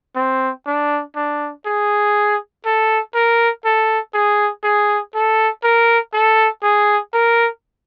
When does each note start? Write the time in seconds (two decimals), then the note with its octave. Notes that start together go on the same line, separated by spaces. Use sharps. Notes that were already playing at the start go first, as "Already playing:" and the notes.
0.16 C4
0.67 D4
1.16 D4
1.66 G#4
2.65 A4
3.15 A#4
3.65 A4
4.14 G#4
4.64 G#4
5.15 A4
5.64 A#4
6.14 A4
6.63 G#4
7.14 A#4